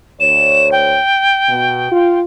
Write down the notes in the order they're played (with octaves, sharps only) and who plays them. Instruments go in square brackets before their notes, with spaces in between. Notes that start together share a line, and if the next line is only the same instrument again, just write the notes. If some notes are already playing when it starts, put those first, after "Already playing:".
[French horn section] D2 C#5 [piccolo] E7
[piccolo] G5
[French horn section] B2
F4